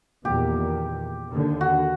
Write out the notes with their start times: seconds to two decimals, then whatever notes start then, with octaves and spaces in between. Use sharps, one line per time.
0.25 E2 A#2 D#3 G4
1.30 D#2 D3
1.61 F#4